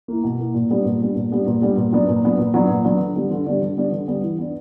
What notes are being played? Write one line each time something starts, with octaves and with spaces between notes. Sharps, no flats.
A#3 E4
B2
A#3 E4
A#2
G3 B3 D4
A#2
G3 B3 D4
A#2
G3 B3 D4
A#2
G3 B3 D4
A#2
F#3 B3 D4
A#2
F#3 B3 D4
A#2
F#3 B3 D4
A#2
F#3 B3 D4
D3
G3 B3 D4
D3
G3 B3 D4
D3
G3 B3 D4
D3
G3 B3 D4
E3
B3 D4